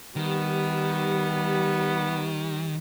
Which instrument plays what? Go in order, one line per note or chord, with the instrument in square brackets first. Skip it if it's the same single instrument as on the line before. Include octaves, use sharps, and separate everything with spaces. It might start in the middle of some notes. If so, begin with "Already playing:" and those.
[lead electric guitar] D#3 [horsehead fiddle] G3 G4 [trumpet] B3